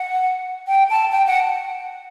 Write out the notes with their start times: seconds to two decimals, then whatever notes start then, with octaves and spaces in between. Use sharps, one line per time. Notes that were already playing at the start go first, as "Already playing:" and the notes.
Already playing: F#5
0.68 G5
0.90 A5
1.11 G5
1.27 F#5